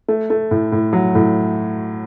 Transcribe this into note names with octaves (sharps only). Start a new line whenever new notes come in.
A3
A3
A2
A2
F#3
A2